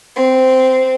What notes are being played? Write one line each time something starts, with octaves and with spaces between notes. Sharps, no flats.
C4